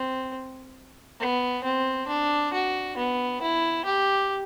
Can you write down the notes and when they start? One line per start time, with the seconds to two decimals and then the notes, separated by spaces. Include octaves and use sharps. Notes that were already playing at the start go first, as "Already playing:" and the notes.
Already playing: C4
1.20 B3
1.64 C4
2.08 D4
2.53 F#4
2.97 B3
3.42 E4
3.85 G4